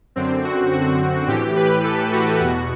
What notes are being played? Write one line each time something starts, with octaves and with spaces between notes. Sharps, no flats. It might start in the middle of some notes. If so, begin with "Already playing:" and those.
F#2 D3 C4
F#4
F#4
A2 E3 G4
B4
A4
F#4
E2 B2 F#4